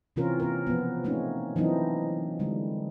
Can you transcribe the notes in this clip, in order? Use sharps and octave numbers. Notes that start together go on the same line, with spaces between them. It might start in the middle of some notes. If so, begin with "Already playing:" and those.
C3 E3 C4 C#4 F4 A#4
A#3 A#4
F3 B3
A3 A#3 C4 C#4 D#4
E3 F#3 A#3 C4 D4 D#4
D3 G3 G#3